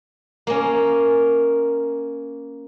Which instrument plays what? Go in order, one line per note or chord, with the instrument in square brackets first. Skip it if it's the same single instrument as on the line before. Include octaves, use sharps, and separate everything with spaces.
[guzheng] A#3 C#4